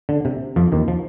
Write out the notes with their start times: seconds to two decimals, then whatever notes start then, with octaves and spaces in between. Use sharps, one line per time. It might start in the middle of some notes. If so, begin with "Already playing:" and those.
0.09 D3
0.25 C3
0.56 F2 F3
0.72 D#2 D#3
0.88 F3